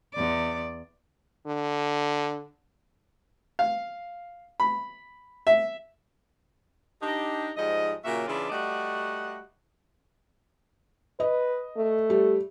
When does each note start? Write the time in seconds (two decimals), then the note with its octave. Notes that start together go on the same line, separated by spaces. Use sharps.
0.14 E2 D5
1.47 D3
3.59 F5
4.60 B5
5.47 E5
7.02 D4 D#4 G4
7.57 G#2 F3 G3 D#5
8.05 A#2 C#3 F#3 A#3 F#4 E5
8.28 C#3 E3 D4 E4 F4 D5
8.50 G3 A3 F#4 D5 D#5 F#5
11.20 B4 D#5
11.77 A3
12.10 G3